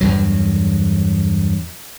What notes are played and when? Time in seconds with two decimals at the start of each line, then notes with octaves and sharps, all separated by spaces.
0.01 E2 G2 F#3